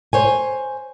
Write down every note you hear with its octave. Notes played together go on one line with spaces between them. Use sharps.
C5 C#5 G#5